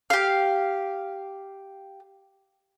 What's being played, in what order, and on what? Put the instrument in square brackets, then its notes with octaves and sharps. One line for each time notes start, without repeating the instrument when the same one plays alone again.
[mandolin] G4 F5